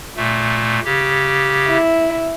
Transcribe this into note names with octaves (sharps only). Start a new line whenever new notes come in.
A#2 A3
C#3 G4
E4